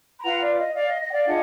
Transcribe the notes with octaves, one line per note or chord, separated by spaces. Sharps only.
B5
F4 B4 F#5 A#5
D5
D#5
D5 F5
D#5
D#5
F#5
D5 F5
D4 F4 G#4 D#5 F#5